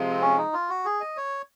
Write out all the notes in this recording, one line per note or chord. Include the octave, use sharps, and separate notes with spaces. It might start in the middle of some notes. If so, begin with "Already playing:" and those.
Already playing: C3 F3 G#3
C4
C#4
D#4
F4
F#4
G#4
D#5
C#5